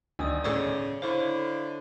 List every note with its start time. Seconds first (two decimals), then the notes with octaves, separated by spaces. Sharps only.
0.19 G1 D2 D#3 D5 G#5 D#6 E6
0.44 A2 C#3 C#5 D5 D6 E6 G#6
1.02 D3 E4 C5 C#5 F5 C#6